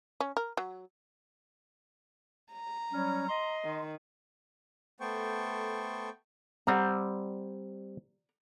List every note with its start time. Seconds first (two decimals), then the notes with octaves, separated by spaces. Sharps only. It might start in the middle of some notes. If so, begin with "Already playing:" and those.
0.20 C#4
0.37 A#4
0.57 F#3
2.53 A#5
2.92 F#3 G3 C#4
3.28 D#5 C6
3.64 D#3
5.00 A3 B3 A4 C5 G5 C#6
6.67 G3 C4 D5 F#5 A#5